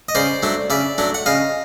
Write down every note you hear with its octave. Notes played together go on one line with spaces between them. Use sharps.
D#5
C#3 C5 D5
F#3 A3 D4
C#3 D5 E5
F#3 A3 D4
F#5
C#3 D#5 F5